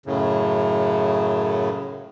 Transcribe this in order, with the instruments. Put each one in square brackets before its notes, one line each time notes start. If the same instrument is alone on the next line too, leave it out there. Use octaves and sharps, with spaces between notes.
[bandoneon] F#2 A2 C#3